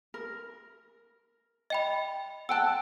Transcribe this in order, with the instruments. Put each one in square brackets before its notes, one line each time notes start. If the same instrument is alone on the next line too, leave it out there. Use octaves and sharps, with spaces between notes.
[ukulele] A#4
[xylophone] D#5 G5 B5
[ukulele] F#5 G5 A5 [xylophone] E6 F#6